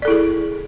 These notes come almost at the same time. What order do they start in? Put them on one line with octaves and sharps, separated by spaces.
D5 A4 E4 G#4